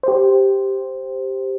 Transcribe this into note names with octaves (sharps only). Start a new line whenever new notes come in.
G4 C5